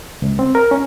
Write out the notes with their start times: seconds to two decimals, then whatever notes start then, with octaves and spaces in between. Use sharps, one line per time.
0.22 C#2
0.39 C4
0.55 A#4
0.71 C#4